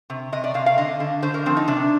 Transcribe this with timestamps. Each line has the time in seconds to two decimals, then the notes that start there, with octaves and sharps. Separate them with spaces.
0.10 C3
0.32 C3 D#5
0.44 D5
0.54 C3 F5
0.66 F5
0.78 D3 D#5
1.00 D3
1.22 D3 C5
1.34 A#4
1.46 F3 C4
1.57 D#4
1.68 C3 D4